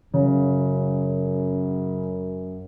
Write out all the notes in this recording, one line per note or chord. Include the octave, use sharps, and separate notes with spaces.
F#2 C#3